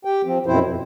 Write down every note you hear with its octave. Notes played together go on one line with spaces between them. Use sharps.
G4 G5
F3 C4
F#2 B2 F3 C4 E4 C5
F2